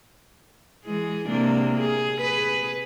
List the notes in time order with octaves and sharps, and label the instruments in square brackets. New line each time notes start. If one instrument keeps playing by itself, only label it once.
[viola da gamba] E3 G#3 G#4
C3 A#3 D4
G#4
G#4 B4